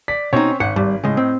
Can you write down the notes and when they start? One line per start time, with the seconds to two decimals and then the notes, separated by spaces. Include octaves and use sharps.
0.08 D5 B6
0.33 B2 C4 C#4 D#4 C#5
0.60 G#1 F#5
0.76 G#1 G3
1.04 A2 C#3 G#3 D#5
1.17 C4